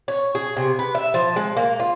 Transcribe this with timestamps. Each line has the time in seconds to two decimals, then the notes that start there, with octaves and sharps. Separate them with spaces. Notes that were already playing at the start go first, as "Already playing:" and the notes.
0.08 C#5
0.35 G#4
0.56 C3
0.79 B4
0.95 E5
1.14 F3
1.36 G#3
1.57 A#3
1.80 F4